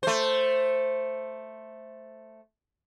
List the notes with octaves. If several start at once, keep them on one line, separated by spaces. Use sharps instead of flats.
A3 C5